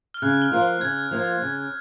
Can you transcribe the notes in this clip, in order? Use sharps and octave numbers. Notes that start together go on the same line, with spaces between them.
F6
C#3 F#6
F6
F3 A#3 F4
F6
C#3 G#6
F3 A#3 F4
C#3